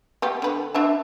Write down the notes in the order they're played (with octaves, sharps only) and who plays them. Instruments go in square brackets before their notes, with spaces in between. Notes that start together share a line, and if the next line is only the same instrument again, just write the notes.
[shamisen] B3 G4
D3 B4
D4 E5 A5